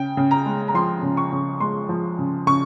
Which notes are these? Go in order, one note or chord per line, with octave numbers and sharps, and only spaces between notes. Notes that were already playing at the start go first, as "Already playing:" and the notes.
Already playing: C#3 G5
C#3
A#5
G#3
A#5
F3 C6
C#3
C#6
C#3
G#3 C6
F3
C#3
C#3 C#6